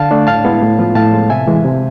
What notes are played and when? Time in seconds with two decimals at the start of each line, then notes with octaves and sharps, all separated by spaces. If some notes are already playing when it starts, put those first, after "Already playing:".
Already playing: D3 F5 A5
0.11 A3 D4
0.27 A2 F5 A5
0.44 G#3 B3 E4
0.62 A2
0.79 F3 B3 F4
0.95 A2 F5 A5
1.13 G#3 B3
1.30 C3 E5 G#5
1.47 E3 G#3
1.65 C3